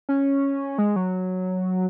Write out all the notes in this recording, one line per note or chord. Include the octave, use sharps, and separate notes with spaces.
C#4
G#3
F#3